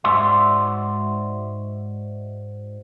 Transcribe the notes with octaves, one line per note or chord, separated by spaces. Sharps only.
G#2 F#4 D5 E5 C6